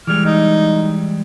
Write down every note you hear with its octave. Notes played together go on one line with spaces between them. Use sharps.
E3 G3 G#3 F6
D#4